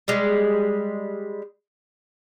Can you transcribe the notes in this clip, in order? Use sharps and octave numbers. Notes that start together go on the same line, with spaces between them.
G3 G#3